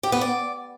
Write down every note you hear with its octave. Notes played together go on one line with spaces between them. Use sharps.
G4
B3
D5